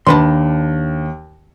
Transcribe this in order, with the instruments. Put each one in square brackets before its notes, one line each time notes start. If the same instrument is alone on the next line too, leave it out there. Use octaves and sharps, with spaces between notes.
[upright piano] D#2 [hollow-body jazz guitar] D4 B4 C6